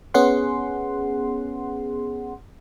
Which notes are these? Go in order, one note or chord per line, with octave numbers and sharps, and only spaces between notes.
B3 C#4 G#4 F#5 C6